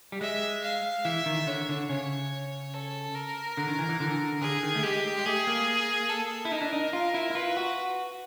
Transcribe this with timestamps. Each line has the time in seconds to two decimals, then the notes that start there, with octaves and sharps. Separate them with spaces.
0.12 G3
0.21 G#3 E5
0.63 F5
1.05 E3 E5
1.26 D#3
1.47 D3 C#5
1.69 D3
1.89 C#3 C#5
2.74 A4
3.15 A#4
3.57 D3
3.68 D#3
3.79 E3
3.89 E3
4.00 D3
4.41 D3 G#4
4.63 D#3
4.75 A3
4.83 G#3 G4
5.19 G#3
5.25 A3 G#4
5.47 A#3
6.09 A4
6.45 E4
6.52 D#4 A#4
6.62 D4
6.73 D#4
6.93 F4 A#4
7.14 E4
7.30 E4
7.35 F4 B4
7.57 F#4